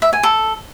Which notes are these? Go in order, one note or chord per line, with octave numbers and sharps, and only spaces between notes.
E5
G#5
A4